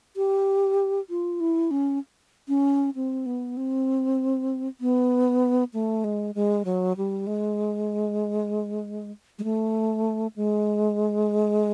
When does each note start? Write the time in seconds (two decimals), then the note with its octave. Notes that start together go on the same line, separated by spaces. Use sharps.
0.16 G4
1.10 F4
1.40 E4
1.71 C#4
2.48 C#4
2.96 C4
3.26 B3
3.57 C4
4.81 B3
5.74 A3
6.04 G#3
6.35 G#3
6.65 F#3
6.97 G3
7.27 G#3
9.39 G#3
9.44 A3
10.36 G#3